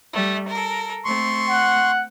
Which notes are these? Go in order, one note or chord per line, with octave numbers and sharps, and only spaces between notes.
G3 A3
A4 A#4
A3 C4 C6 C#6
F#5